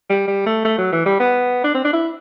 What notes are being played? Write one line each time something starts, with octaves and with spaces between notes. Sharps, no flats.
G3
G3
A3
A3
F#3
E3
G3
B3
D4
C4
D4
E4